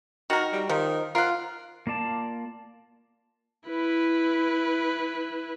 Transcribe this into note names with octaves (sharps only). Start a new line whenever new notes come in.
D#3 F#4 A#4
G3
D#3 F3 D#4
F4 A#4 F#5
A#3 F4 D5 A5
E4 B4